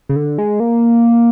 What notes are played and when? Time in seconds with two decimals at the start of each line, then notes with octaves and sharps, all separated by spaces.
0.09 C#3
0.16 D3
0.38 G#3
0.60 A#3